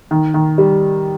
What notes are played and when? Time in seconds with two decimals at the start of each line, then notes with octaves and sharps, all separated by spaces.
0.11 D#3
0.34 D#3
0.58 G3